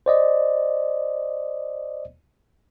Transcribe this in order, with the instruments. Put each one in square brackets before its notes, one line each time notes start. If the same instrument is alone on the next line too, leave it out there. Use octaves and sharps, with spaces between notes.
[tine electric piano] C5 D5 D#5